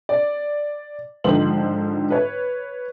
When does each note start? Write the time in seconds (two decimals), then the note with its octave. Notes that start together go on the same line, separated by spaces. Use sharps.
0.09 D5
1.24 G#2 D3 D#3 F3 C5 F#7
2.11 B4 C#5